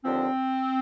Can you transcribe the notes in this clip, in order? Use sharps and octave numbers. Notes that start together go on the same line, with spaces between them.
D#2 D3 F3 C4